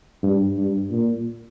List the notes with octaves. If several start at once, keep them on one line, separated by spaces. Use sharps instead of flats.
G2
G2
A#2